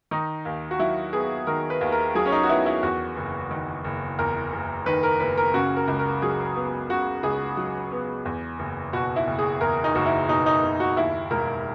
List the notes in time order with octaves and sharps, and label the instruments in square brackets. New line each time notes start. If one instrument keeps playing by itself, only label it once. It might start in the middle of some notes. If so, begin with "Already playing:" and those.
[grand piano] D#3 D#4
D#2
F#4
F#3 E4
B3 G#4
D#3 A#4
B4
D#2
A#4
F#3 G#4
C#4
D#4
F#4
B3 E4
E4
E2 F#4
F#1
D#3
F#1
E2 A#4
F#1
D#3 B4
A#4
F#1 B4
A#4
C#3 F#4
A#4
C#2
A#4
F#3 G#4
B3
C#3 F#4
C#2 G#4
F#3
B3
E2
F#1
B2 F#4
E4
F#1
G#4
E2 A#4
D#4
F#1 F#4
E4
B2 D#4
D#4
F#1
F#4
D#2 E4
E1 A#4